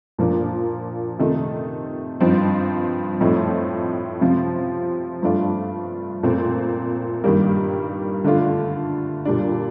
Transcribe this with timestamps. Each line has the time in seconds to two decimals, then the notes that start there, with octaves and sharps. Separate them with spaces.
0.18 A#2 F3 A#3 D4
1.19 C3 D#3 A3 D#4
2.20 G2 F3 C4 D#4
3.21 A2 F3 A3 C4 D#4
4.21 C3 F3 C4 F4
5.22 G2 F3 A3 D4 F4
6.23 A#2 A3 C4
7.24 G2 D#3 G3 A#3
8.24 D3 A3 D4 F4
9.25 A#2 G3 D4